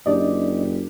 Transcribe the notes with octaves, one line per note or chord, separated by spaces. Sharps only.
F#1 D4 G4 D5 D#5